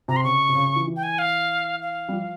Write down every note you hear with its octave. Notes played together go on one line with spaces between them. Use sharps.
C3 A#5
C6
C#3 C#6
C3
C#3
C#3
E3
E3
G5
G#5
F5
F5
G3
F3